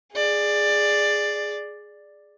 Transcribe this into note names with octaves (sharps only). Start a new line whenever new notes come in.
G#4 D5